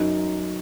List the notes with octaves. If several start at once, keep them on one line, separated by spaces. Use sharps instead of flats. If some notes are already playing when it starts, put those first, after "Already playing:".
Already playing: F#2 D#4